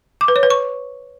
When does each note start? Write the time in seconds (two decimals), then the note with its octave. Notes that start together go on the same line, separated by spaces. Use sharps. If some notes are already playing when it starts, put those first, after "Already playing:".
0.21 D6
0.28 B4
0.36 C#5
0.43 B4
0.50 C#6